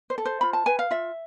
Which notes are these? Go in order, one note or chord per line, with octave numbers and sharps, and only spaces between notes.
C5
A4
C5
F4 B5
A5
B4 G#5
F5
F4 E5